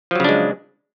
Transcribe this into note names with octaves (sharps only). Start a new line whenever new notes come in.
C#3 F3 F#3 G#3 D4